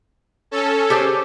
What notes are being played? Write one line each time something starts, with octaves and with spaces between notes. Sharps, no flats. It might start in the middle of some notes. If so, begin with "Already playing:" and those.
C#4 A4
G4 G#4 C5